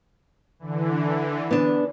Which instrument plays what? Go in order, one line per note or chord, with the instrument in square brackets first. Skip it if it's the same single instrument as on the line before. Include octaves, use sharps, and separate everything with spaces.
[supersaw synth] D3 E3
[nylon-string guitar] B3 D4